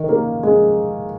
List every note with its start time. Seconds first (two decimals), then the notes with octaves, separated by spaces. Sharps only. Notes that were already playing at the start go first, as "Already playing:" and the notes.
Already playing: D#3
0.09 A#3
0.43 G#3